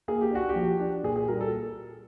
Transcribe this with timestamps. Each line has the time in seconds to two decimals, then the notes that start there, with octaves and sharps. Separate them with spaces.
0.08 A#3 G#4
0.21 G4
0.31 D4 F#4
0.49 G4
0.56 F3
0.80 D4
1.04 A#2 G#4
1.16 G#4
1.28 G3 A#4
1.41 A4